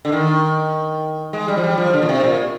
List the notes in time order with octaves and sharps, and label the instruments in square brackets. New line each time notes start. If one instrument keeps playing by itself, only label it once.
[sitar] D3
D#3
G#3
G3
F3
G3
F3
D3
A#2
C3
A#2